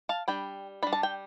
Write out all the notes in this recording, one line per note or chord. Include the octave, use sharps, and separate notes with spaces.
F5 A5
G3 D4 G5 B5
G3 D4 B5
A5
G5